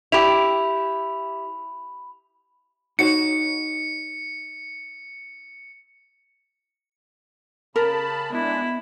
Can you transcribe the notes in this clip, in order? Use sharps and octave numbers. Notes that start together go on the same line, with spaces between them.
E4 G4 B5 F7
D#4 F#4 C#5 C#7
C#3 A#4 A5 B5
G#3 B3 D4 E4